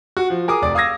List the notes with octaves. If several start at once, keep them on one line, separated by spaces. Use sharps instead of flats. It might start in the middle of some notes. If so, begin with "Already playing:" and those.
F#4
F3
G#4 A#4 D6 D#6
F1 D5
F5 D#6 E6 G#6 A#6